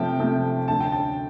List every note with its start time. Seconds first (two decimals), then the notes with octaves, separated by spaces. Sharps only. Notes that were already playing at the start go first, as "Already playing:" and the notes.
Already playing: C3 F3 A3 G5 A5
0.19 C3 F3 A3
0.68 D2 D3 A3 A5
0.80 G5
0.92 A5